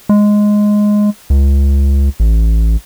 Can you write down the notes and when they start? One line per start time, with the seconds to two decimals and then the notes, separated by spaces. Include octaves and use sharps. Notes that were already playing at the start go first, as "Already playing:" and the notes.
0.09 G#3
1.30 C#2
2.20 A1